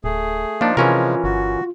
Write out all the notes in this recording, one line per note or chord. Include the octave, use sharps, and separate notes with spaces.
D1 A3 G#4
F3 A#3 D4 D#4 F4
C3 E3 F3 G#3 C#4 F4 A#4
G1 F#4